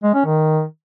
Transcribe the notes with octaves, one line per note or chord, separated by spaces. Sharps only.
G#3
C#4
D#3